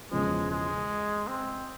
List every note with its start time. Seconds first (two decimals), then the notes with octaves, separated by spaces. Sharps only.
0.11 E1 E2 C#3 F3 G#3
0.51 G#3
1.27 C4